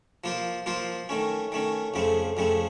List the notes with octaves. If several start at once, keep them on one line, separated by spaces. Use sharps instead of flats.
F3 A#3 F4 C5
F3 A#3 F4 C5
D#3 A3 C#4
D#3 A3 C#4
F2 C#3 A3 C4
F2 C#3 A3 C4